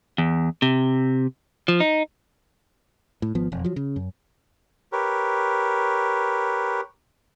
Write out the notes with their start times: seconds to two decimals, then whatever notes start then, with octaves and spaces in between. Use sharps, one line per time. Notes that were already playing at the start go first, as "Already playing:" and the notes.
0.18 E2
0.62 C3
1.68 F3
1.80 D#4
3.22 A2
3.35 G#1 F3 B3
3.52 E1 F2
3.64 F3 F#3
3.76 C#3
3.96 F#2
4.92 G4 A#4 B4 C#5